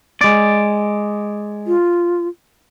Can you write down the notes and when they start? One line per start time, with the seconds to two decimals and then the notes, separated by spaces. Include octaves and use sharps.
0.21 G#3 D5
1.67 F4